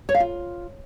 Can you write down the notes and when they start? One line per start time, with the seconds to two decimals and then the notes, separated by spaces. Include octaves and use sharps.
0.09 C#5
0.14 F5
0.20 F4